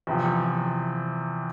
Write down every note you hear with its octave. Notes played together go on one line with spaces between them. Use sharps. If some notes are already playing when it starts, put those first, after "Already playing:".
E2 C3 F3